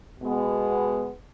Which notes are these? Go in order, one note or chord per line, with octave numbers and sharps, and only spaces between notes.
B2 G#3 B3